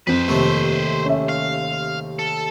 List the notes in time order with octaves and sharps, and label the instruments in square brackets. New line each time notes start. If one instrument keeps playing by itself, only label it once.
[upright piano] F2 C4 [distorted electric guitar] B4 C5
[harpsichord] D#2 C3 A3
[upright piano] C#4 E5
[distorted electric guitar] F5
A4